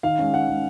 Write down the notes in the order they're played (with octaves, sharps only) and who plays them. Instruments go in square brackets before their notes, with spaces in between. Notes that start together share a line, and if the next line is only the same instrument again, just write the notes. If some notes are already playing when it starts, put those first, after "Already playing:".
[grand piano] D#3 F5
G#3 C#4
D#3 F#5
G#3 C#4